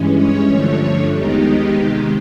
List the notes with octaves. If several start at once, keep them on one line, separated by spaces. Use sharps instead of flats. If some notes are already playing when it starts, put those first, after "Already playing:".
Already playing: G2 E3 G#3 C#4
C#5
G2 D3 F3 A3
D#2 D#3 G#3 B3 D#4 G4
C3 D#3 G#3